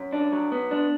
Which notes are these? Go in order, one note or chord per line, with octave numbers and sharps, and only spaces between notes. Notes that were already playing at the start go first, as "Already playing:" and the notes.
Already playing: F#2
D4
F#3
B3
D4